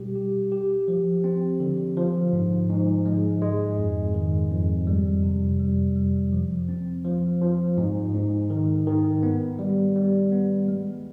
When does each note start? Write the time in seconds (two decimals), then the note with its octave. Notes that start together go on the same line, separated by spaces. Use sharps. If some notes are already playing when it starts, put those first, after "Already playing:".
Already playing: B2 G3 G4
0.15 G4
0.52 G4
0.88 F3
1.24 C4
1.60 D3
1.97 F3
2.33 G#2
2.69 G#2
3.06 G#3
3.42 G#3
3.78 F2
4.14 D#3
4.51 F2
4.87 G3
5.23 C3
5.60 G3
5.96 G3
6.32 F3
6.69 C4
7.05 F3
7.41 F3
7.77 G#2
8.14 G#2
8.50 D#3
8.87 D#3
9.23 B3
9.59 G3
9.96 G3
10.32 B3
10.68 G#3